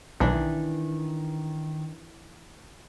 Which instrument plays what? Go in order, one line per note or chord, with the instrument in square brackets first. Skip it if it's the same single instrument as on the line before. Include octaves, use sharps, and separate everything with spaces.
[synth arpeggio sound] B1 [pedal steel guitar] D#3 [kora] E3 D4